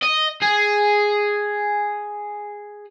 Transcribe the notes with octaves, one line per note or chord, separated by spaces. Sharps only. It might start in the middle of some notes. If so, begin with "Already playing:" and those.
D#5
G#4